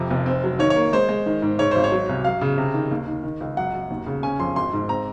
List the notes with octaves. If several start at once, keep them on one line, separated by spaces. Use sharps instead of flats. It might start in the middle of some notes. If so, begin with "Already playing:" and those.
Already playing: F2 C3
F1
C4
F#3
D#3 C#5
C#5
A#3
G#3 C5
G#3
D#3
G#2
G#2 C#5
G#1 C5
C#5
F#3
C2
F#2 F5
C#3
C3
D#3
D#2
D#3
D#3
C#2
F#2 F#5
F#2
D#2
C#3
C#4 G#5
F2 C6
G#1 C6
G#2
C4 A#5